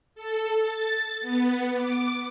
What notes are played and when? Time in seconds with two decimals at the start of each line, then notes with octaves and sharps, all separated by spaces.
0.15 A4
0.63 A6
1.21 B3
1.74 D6